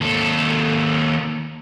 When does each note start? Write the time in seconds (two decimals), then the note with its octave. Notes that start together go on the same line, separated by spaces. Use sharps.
0.01 D#2 A4